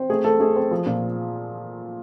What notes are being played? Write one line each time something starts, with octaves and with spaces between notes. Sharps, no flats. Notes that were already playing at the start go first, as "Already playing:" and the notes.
Already playing: C4
A3 G#4
A3 A4
A3 G#4
C4
F3
A#2